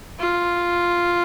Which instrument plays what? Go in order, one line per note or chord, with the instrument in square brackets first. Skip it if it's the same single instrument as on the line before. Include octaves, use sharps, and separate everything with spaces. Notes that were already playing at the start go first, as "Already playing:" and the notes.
[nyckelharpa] F4